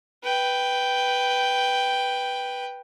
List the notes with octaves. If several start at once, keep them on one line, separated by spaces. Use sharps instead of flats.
B4 G5